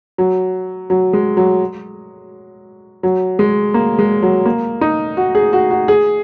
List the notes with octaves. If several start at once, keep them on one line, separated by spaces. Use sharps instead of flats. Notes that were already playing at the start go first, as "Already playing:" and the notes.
F#3
F#3
G#3
F#3
F#3
G#3
A#3
G#3
F#3
A#3
D#4
F#4
G#4
F#4
F#4
G#4